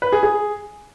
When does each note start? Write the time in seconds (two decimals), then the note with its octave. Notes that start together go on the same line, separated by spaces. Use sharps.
0.02 B4
0.12 G#4
0.23 G#4